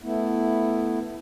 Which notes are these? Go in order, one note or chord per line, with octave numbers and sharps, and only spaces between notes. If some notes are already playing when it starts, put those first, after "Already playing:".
A3 B3 E4